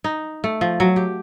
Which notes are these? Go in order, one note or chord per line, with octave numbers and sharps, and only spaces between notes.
D#4
A3
F3
F#3
G4